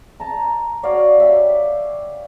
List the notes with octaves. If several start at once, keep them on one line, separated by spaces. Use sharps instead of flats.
A5 A#5
F#4 C#5 D5 F5
G4 E5 F5